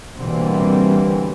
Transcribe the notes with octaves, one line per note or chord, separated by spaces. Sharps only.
B2 D3 E3 G3 A#3 C4